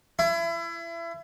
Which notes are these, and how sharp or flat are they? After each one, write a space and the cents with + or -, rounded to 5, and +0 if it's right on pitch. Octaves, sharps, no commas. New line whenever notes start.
E4 +30